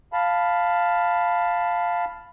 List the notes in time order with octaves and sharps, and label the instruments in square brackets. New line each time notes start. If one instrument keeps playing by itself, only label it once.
[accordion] F5 A5 B5